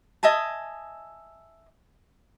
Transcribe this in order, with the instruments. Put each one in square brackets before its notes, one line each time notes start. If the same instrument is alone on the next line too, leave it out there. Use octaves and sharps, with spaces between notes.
[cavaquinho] D#5 E5 G#5 A5